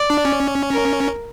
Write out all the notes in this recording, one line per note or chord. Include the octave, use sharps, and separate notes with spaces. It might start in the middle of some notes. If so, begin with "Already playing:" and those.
Already playing: D5
D4
C#4
A#4